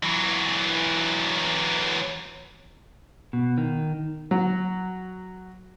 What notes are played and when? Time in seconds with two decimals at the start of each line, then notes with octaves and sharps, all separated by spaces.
0.03 E3 F#3
3.33 B2
3.58 D#3
4.31 F#3